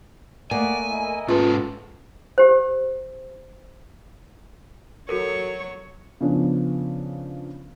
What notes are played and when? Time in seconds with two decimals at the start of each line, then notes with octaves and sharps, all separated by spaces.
0.51 A3 A#3 D5 D#5 F#5 G#5
0.90 E4 A#4 D#5
1.28 G#2 C#4 F4 G#4 A4 B4
2.38 G4 C5
5.09 F#3 F#4 A4 A#4 C#5
6.21 C#3 F3 B3 C#4 D4